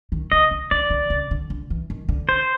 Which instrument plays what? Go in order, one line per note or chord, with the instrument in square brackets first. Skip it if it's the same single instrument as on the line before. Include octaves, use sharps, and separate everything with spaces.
[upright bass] D#3
[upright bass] C#3 [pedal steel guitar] D#5
[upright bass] D3
[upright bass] D3 [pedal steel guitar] D5
[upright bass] D3
C#3
D3
D3
E3
D#3
D3
[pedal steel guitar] C5